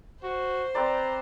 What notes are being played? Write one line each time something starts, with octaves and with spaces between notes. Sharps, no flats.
F#4 C5
C4 B4 D5 A#5